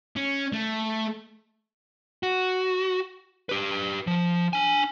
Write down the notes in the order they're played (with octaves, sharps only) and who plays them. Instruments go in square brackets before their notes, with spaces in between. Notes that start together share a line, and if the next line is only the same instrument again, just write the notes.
[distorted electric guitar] C#4
A3
[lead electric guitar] F#4
G4 B4
F3
D4 G#5